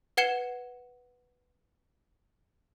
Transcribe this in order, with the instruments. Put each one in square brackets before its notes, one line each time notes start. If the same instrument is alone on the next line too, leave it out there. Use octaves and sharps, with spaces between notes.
[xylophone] B4 F#5 G#6 C#7 E7 G7